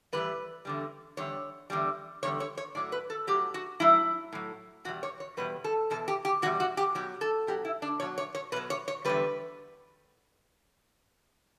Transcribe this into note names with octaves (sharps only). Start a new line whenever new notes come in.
A2 E3 G3 B4
E2 D3 G3
E2 D3 G3 C#5
E2 D3 G3
E2 D3 G3 C#5
C#5
C#5
A2 F#3 D5
B4
A4
A2 F#3 G4
F#4
A2 F#3 E4
A2 F#3
E2 B2 G3 F#4
C#5
C#5
E2 B2 G3 B4
A4
E2 B2 A4
G4
G4
E2 B2 G3 F#4
F#4
G4
B2 F#3 G4
A4
B2 F#3 G4
E4
D4
B2 F#3 C#5
C#5
C#5
B2 F#3 B4
C#5
C#5
E2 D3 G3 B4